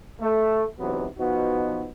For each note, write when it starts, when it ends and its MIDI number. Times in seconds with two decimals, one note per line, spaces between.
0.20 0.64 57
0.79 1.05 44
0.79 1.05 48
0.79 1.05 52
0.79 1.05 54
0.79 1.05 59
1.18 1.87 47
1.18 1.87 53
1.18 1.87 59
1.18 1.87 63
1.18 1.87 66